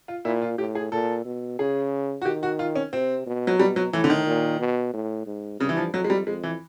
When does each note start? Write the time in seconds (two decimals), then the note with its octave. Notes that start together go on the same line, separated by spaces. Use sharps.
0.08 F4
0.25 A#2 E4
0.42 F4
0.58 A2 G4
0.75 G#4
0.92 A#2 A4
1.25 B2
1.59 C#3 G#4
2.22 F#4
2.25 D#3 G4
2.43 F#4
2.59 F4
2.76 C#4
2.93 C3 C4
3.27 B2
3.47 F#3
3.59 B2 G3
3.76 F#3
3.93 A2 E3
4.04 D3
4.10 D#3
4.26 A#2
4.60 B2
4.93 A2
5.26 G#2
5.60 G2 C#3
5.69 E3
5.77 F3
5.93 F2 F#3
6.04 G#3
6.10 G3
6.27 F2 G#3
6.43 E3